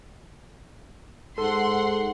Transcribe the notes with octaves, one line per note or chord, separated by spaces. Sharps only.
G#2 A4 F#5 C6